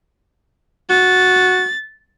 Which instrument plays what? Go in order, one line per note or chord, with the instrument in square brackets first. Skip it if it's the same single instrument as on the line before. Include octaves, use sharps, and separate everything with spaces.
[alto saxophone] F#4 [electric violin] A6